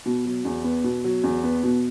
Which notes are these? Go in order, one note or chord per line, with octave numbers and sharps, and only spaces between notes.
B2
F#3
E2
B3
B2
F#3
E2
B3
B2